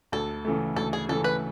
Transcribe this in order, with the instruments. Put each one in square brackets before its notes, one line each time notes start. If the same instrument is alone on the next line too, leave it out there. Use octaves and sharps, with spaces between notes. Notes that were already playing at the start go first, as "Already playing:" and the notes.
[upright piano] D2 [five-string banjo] A4
[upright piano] C#3 E3 A3
[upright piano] D2 [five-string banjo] A4
[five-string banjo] G#4
[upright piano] C#3 E3 A3 [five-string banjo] A4
[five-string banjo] B4